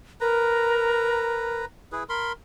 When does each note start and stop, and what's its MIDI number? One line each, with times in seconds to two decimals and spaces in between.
0.21 1.61 70
0.21 1.65 71
0.21 1.65 82
1.92 2.03 64
1.92 2.03 68
1.92 2.03 71
2.09 2.32 70
2.09 2.32 83
2.09 2.32 84